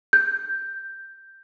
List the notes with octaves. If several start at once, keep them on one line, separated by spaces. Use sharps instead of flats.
G6